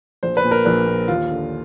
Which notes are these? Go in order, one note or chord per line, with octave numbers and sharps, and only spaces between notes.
A#1 C5
B4
A#2
A#4
A#1 B4
A#2
D#2 F4
D3